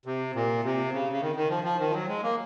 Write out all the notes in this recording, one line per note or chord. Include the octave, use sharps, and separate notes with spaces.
C3
A#2
C3
C#3
C#3
D#3
D#3
F3
F3
D#3
F3
F#3
G#3
A#3